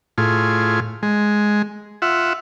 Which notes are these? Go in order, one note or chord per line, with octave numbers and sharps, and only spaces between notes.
A2 F4 G#4
G#3
F4 E5 F#5